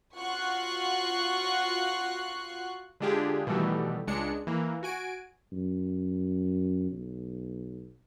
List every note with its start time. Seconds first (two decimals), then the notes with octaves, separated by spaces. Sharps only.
0.17 F4 F#4 F#5 C#6 F#6 C7
3.00 D3 G#3 D4 F4 G4 G#4
3.47 B2 D#3 E3 G3 A3
4.07 C#2 G#3 D4 C#7
4.47 E3 A#3
4.83 F#4 G#5 D7
5.52 F#2
6.92 B1